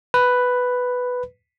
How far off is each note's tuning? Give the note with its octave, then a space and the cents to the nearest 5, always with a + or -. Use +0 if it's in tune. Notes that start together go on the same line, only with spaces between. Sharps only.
B4 +5